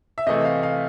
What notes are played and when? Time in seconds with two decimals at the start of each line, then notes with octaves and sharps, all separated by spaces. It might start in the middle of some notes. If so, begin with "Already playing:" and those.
0.18 E5
0.27 C3 E3 A3 D#5
0.45 F5
0.63 F5